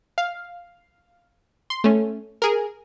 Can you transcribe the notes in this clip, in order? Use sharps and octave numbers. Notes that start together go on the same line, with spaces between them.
F5
C6
A3 C#4
G#4 A#4